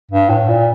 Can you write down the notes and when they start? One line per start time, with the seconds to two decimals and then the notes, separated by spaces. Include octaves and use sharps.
0.11 G2
0.30 A2
0.49 A#2